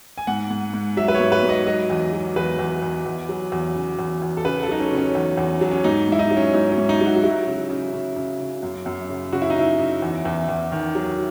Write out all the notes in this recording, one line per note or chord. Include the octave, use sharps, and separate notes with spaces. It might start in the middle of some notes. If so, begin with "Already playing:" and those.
G#5
G#2 F#5
G#2
G#2
F#3 E5
B4
C#5
G#2
B4
G#2
D#5
F#3 D#5
E2
F#3
E2 B4
E2
E2
E2
F#3
E2
C#3
E2
E2
A4
C#3 B4
A4
F#3 D#4
C#4
C#3
C#4
E2
E2
F#3
C#4
G#2 D#4
G#2 E4
D#4
F#3
C#4
G#2 D#4
C#4
G#2
D#4
F#3
F#4
F#4
F#3 E4
C#3
C#3
C#3
C#3
C#3
F#2
F#2
C#3
C#3 F#4
E4
D#4
C#3 E4
C#3
E2
E2
E2
D#3
F#3